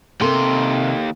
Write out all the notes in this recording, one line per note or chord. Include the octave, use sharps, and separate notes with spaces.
D#2 C3 A#3 A4 C6